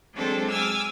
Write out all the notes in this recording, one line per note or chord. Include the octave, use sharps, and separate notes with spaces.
F#3 G#3 C4 D4 A4 C5
G#5 D6 E6 F6